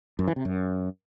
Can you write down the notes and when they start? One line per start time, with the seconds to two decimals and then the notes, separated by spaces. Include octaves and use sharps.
0.19 F#2
0.28 E3
0.36 C3
0.45 F#2